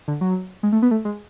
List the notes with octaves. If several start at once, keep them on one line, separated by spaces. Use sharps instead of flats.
D3
F#3
G#3
A3
B3
A3
G#3